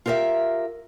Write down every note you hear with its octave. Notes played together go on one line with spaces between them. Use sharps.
F4 G4 A#4 D#5 E5